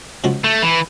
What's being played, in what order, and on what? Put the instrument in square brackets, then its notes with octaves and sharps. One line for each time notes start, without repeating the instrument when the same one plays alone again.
[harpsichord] C#3 F3 G#3 C#4 F#4
[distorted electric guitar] A3
E3